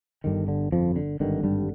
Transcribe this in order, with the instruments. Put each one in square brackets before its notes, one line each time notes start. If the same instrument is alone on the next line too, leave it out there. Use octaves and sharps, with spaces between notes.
[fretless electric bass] G1 G2 D3 D#3
D3
F2 F3
D3
G#1 G2 D3 D#3
G2 G3